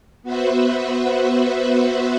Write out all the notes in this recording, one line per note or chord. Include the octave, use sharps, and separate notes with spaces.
B3 F#4 B4 C5 E5